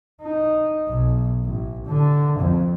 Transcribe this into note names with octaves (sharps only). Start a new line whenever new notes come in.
D#4
B1
A1
D3
F2